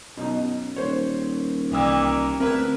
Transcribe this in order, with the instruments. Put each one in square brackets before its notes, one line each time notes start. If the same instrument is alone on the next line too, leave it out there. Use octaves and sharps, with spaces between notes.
[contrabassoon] F#2 [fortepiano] B2 D#4
[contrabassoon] D#1 [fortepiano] C5 C#5
[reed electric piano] C2 E6 [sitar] E3 G3 A#3
[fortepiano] D2 A#4 [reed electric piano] C4 [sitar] E4 B4